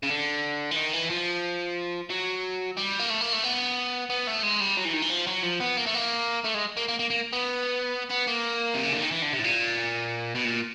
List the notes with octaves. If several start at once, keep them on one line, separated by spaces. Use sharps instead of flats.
C#3
D3
E3
D#3
E3
F3
F#3
G3
A#3
A3
A#3
A3
B3
B3
A3
G#3
G3
F#3
E3
D#3
E3
F3
F#3
F3
B3
A#3
A3
A#3
A3
G#3
A#3
A#3
A#3
A#3
B3
B3
A#3
C3
C#3
D3
D#3
E3
D3
C3
A2
A#2
B2
A#2